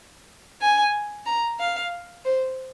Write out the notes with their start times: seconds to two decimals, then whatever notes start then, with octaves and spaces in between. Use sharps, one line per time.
0.61 G#5
1.26 A#5
1.59 F5
2.25 C5